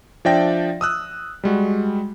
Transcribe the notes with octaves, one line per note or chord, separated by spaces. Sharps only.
F3 D4 D5 E5 G5 A#6
D#6 E6 F#6
G3 G#3 F#4